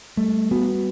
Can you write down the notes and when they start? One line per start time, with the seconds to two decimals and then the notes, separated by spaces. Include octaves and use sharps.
0.17 G3 A3
0.51 B3 F#4